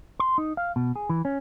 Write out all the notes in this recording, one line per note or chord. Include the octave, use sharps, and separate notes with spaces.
C6
D#4
F5
B2
G#4
E3
C#4